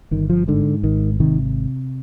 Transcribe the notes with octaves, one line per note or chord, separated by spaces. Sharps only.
G1 D#3
F3
G#2 D3
G#1 D#3
C3 D#3